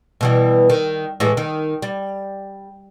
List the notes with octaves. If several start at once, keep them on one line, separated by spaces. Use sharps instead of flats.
B2 E3 G3
D#3
A2 E3 G#3
D#3
G3